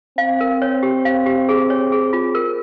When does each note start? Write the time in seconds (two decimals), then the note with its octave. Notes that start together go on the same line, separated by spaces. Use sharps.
0.18 C4 F5
0.41 A#4
0.62 C#5
0.83 G4
1.05 F5
1.26 G4
1.49 G#4
1.70 C#5
1.92 G#4
2.13 F4
2.35 A#4